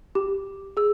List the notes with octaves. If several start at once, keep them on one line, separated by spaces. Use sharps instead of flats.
G4
G#4 E6